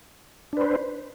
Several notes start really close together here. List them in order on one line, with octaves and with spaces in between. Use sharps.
D4 B4 C5